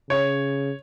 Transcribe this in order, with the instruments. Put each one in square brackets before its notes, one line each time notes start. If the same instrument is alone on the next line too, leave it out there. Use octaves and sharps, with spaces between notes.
[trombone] C#3 [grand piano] C#5